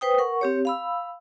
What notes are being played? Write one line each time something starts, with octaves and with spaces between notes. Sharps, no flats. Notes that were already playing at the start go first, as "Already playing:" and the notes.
B4 C5 G5 D#6
A#4 F#5 C#6
C4 G4 C#5
F5 B5 E6